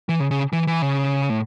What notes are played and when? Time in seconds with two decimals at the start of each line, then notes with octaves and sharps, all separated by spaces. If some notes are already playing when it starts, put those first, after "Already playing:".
0.09 E3
0.20 C#3
0.31 C#3
0.53 E3
0.67 E3
0.82 C#3
1.30 A2